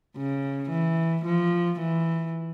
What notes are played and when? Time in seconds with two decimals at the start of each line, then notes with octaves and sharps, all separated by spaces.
0.16 C#3
0.70 E3
1.25 F3
1.80 E3